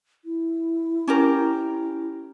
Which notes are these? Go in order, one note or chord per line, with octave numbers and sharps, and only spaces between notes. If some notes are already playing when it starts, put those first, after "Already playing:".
E4
C#4 G4 A#4